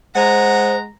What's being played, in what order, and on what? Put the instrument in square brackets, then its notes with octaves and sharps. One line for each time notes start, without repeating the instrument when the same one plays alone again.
[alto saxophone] G#3 [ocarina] C5 [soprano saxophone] F#5 [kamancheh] A#5